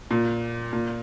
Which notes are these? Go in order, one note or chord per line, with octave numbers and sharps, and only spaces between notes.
A#2
A#2